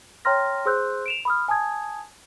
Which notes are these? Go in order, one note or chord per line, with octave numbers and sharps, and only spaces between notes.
C#5 G5 A#5 C6 F6 A#6
G#4 C5 C6 E6 F#6 G6
D7 E7 F7
B5 D#6 F6
G#5 A5 D#6 G#6